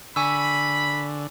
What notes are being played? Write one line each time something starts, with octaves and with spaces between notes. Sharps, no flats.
D3 G#5 B5 C#6 E6